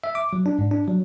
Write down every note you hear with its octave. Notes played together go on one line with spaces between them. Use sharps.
E5
D6
F#3
D4
G#2
D4
F#3